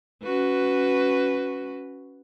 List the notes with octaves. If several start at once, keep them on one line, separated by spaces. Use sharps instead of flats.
C#4 F#4 B4